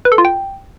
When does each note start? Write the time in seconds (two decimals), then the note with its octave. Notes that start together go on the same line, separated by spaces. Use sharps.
0.05 B4
0.12 A4
0.18 F4
0.25 G5